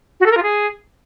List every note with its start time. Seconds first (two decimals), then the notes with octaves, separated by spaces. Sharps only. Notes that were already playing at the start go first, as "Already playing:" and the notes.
0.20 F#4
0.26 A4
0.31 A#4
0.37 F4
0.43 G#4